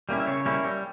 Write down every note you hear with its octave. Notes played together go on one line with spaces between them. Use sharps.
G3 A#3 C#4 E4
E5
C#3 C#5
G3 A#3 C#4 E4
G3